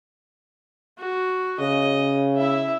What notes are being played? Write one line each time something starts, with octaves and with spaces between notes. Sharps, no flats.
F#4
C#3 D#5
E4 E5